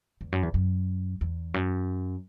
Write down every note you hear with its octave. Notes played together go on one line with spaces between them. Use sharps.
E2
F#2
E2
F#2
E2
F#2